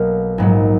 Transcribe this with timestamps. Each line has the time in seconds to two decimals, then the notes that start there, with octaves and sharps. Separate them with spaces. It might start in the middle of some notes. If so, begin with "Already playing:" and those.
Already playing: B1 B2 A#3 D#5 F5
0.38 A#1 G#2 F#3